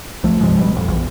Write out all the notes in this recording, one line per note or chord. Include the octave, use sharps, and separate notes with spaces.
C2 F3 A3
G2 C3 F3 G#3
D1 B2 G3
A1 F2
A#1 E2